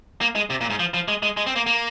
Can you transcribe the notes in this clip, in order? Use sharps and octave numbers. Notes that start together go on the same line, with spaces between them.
A#3
G#3
C3
A#2
G#2
F3
F3
G#3
G#3
G#3
C4
A#3
A#3